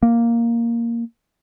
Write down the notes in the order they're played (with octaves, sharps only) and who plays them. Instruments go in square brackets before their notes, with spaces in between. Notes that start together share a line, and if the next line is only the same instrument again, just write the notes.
[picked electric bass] A#3